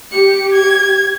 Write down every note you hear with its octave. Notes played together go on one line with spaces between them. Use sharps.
G4 C#7
G#6